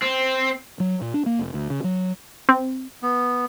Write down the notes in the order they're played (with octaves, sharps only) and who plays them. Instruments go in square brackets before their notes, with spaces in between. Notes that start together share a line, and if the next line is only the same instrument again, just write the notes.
[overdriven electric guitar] C4
[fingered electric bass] F#3
A#2
D4
A#3
F1
D2
C#3
F#3
[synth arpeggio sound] C4
[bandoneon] B3